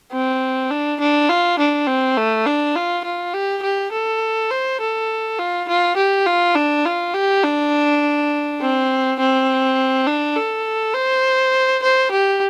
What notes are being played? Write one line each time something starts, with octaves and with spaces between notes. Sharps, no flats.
C4
D4
D4
F4
D4
C4
A3
D4
F4
F4
G4
G4
A4
C5
A4
F4
F4
G4
F4
D4
F4
G4
D4
C4
C4
D4
A4
C5
C5
G4